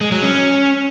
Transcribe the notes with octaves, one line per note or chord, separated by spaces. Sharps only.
G#3
F#3
C#4